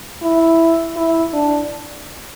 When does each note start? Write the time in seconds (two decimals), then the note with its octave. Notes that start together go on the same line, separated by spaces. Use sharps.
0.22 E4
0.97 E4
1.33 D4